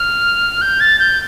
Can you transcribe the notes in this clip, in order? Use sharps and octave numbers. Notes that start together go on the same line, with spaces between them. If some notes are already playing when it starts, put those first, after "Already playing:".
Already playing: F6
G6
A6
G6